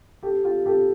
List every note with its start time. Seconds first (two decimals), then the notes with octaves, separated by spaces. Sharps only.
0.23 G4 A4
0.44 F4 G4
0.66 G4 A4